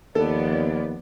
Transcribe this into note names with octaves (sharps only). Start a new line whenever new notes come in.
D#2 F3 B3 A4 D5